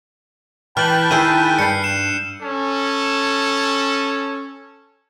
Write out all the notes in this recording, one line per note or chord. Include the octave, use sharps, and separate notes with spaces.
E3 G5 A5 B5 F6 F#6 F#7
D#3 E4 G#4 E6 G6 D#7
G2 C7 C#7
C7 E7
C#4 A4